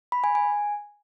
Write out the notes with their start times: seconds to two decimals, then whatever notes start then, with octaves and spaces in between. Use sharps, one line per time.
0.12 B5
0.24 G#5
0.35 G#5